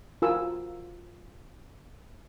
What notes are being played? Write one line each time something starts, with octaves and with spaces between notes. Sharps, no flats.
F4 F#4 A#4 G#5 E6